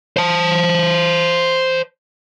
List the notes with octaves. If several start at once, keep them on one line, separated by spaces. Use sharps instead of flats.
C5 A5